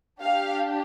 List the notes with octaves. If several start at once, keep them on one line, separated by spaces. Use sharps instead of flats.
D4 G4 F5